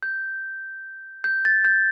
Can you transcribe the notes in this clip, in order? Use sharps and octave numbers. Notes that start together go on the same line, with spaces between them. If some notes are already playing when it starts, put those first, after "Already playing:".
G6
G6
A6
G6